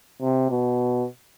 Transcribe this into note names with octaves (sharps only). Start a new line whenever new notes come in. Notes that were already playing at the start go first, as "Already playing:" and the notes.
C3
B2